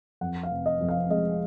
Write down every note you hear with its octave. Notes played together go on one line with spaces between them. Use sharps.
F2 F#5
F5
F1
D#5
F2
F5
G#3 D#5